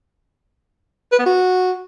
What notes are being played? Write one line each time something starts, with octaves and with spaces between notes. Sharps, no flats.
B4
B3
F#4